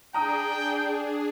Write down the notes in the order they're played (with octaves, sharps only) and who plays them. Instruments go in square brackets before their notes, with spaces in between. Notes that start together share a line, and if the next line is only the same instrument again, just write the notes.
[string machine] D4 G#4 [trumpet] G5 [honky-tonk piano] A#5 D#6